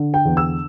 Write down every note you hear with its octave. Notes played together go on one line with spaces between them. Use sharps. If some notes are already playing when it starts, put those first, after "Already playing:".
Already playing: D3
G5
E2
E6